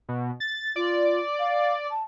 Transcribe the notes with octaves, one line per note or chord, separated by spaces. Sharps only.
B2
A6
F4 D5
F5
A5